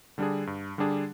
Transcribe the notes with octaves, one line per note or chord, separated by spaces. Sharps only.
D3 G3 D4 G#4
G2
D3 G3 D4 G#4